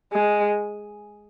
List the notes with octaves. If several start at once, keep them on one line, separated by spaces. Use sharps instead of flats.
G#3